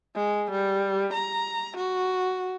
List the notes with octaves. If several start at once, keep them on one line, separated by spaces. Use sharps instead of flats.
G#3
G3
A#5
F#4